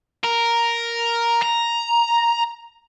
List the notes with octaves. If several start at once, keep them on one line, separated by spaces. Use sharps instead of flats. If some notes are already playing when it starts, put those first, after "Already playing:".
A#4
A#5